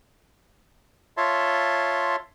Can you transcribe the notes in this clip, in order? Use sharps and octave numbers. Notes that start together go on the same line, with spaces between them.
F4 C#5 E5 A5 C6